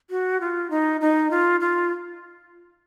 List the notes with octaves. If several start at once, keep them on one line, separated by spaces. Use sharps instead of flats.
F#4
F4
D#4
D#4
F4
F4